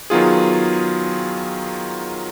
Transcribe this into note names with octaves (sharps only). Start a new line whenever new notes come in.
D#3 F#3 B3 F4 G#4